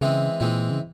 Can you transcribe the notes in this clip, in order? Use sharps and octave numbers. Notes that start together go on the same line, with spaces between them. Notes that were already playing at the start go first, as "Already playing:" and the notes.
C#3 E3 G#3 C4 E4
A#2 E3 G#3 C4 E4
C#3